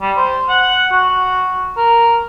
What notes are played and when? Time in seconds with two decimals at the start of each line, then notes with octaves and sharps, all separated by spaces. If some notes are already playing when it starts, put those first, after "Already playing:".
0.01 G3
0.16 C5
0.49 F#5
0.92 F#4
1.77 A#4